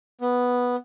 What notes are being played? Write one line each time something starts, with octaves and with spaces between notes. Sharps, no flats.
B3